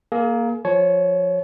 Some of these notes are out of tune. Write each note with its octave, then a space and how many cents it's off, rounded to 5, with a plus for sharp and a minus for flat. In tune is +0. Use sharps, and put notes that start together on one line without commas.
A#3 +5 G#4 +40
F3 +10 C#5 +0 A5 -40